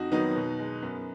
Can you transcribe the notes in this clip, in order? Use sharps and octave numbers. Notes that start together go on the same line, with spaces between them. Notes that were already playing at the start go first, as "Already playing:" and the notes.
Already playing: F2 D#4 F#4
D#3 F#3 B3 D#4
B2
G#3
F#2 B3